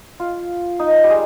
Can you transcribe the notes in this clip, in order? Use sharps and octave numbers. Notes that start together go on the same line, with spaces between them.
F4
D#4
G3
G#3